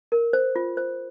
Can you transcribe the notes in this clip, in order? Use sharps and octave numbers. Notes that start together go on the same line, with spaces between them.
A#4
C5
F4
C5